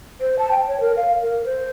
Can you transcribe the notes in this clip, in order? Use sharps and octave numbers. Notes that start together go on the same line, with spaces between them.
C5
A5
G5
C#5
A#4
F5
A#4
C5